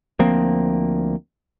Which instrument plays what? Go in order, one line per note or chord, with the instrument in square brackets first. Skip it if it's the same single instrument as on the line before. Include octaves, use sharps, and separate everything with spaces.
[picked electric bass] D2 F3 A#3 C4